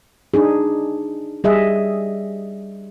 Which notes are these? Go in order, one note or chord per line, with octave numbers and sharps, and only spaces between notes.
D4 D#4 G#4
G3 G#4 D#5 E5